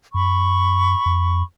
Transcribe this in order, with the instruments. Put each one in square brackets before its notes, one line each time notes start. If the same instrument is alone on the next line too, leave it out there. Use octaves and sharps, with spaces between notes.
[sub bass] F#2 [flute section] B5 C#6
[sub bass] F2